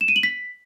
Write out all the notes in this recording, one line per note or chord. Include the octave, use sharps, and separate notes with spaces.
E7
D#7
F#7
B6